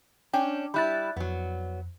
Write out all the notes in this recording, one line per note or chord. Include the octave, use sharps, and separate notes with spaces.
C#4 D4 G5
G3 E4 B5 F#6 A6
F2 F#3 B3